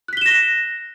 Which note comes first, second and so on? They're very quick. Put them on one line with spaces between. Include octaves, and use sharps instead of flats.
F#6 B6 G7 E7 A#6